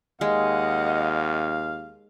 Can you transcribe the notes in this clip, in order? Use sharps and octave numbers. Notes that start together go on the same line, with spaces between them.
D#2 G#3 D#5 F5 F#5